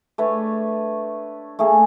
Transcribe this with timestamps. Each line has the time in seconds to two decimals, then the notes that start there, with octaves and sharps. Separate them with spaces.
0.18 A3 D4 B4 C#5
1.59 A3 A#3 G#4